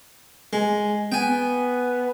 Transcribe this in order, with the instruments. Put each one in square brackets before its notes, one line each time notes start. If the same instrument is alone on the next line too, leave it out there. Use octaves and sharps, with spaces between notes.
[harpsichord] G#3
[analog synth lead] B3 [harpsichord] G5 G#5